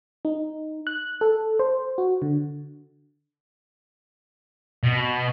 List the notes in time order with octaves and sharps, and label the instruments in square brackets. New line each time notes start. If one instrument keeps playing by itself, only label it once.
[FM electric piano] D#4
F#6
A4
C5
F#4
D3
[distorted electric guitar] B2